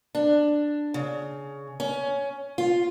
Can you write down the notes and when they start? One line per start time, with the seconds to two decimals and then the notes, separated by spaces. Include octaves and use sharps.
0.15 D4
0.94 C#3
1.80 C#4
2.58 F4